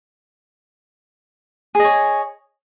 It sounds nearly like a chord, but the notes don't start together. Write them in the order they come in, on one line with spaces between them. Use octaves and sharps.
G#4 D#5 C#5